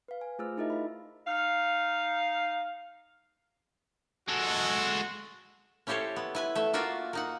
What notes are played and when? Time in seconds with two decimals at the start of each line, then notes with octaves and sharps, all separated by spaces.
0.08 B4 F5
0.21 G#5
0.39 A3 F4 G#4 C5 E6 F6
0.57 D#4 E4 G#4 A#4 D#5 E5
0.70 F5 B5
1.27 D#4 F5
4.28 G#3 F#4 A4
5.87 C#4 E4 G4 A4 C5 C#5
6.16 B3
6.35 E4 B4 G#5
6.55 A3 E5
6.73 A#3 F4 F#4 D5 E5
7.13 A#3 D#4 F#5